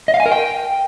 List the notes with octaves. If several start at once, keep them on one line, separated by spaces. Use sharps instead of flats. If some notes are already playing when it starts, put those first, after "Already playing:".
D#5
F5
G#5
A#4
G5